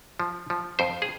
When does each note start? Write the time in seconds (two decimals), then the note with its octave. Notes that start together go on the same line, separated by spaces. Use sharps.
0.20 F3
0.50 F3
0.79 F2 C5
1.02 G#4